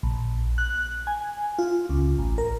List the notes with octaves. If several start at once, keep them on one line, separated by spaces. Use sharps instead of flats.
A#1
F#6
G#5
F4
C#2
A1
A#4